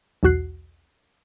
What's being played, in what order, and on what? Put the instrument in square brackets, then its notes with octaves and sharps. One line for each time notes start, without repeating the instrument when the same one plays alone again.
[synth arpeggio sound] B1 E2 F#4 F#6 C7